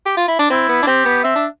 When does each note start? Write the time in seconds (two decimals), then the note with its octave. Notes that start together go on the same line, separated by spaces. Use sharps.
0.06 G4
0.17 F4
0.28 E4
0.39 D4
0.50 C4 E4
0.69 B3
0.83 D4
0.87 C4 G4
1.06 B3
1.24 C4 E5
1.36 D4